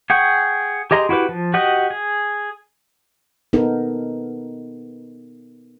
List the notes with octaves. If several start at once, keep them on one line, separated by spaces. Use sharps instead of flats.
G#4 F#5 G5 C#6
G4 G#4 D#5 A#5 C6
E4 F#4 G4 B4
F3
F#4 G4 D#5 F#5
G#4
B3 D#4 A4 A#4